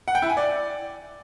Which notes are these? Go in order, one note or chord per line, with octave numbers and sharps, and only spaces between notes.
F#5
G5
E4
G#5
D5